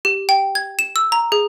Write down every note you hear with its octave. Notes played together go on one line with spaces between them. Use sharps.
G4
G5
G#6
E7
E6
A#5
G#4